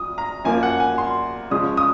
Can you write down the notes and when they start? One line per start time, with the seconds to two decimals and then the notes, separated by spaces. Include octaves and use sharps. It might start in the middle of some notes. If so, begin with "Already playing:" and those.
Already playing: F3 D#6
0.18 A#5
0.44 F#2 F3 A#3 G#5
0.63 F#5
0.80 G#5
0.98 C6
1.51 C#3 F3 G#3 C#4 D#6
1.77 D#6